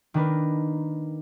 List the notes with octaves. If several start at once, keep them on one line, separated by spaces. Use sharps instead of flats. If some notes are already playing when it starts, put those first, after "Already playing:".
D#3 A#3 D4 A#4 B4